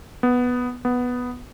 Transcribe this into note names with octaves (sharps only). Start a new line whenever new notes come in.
B3
B3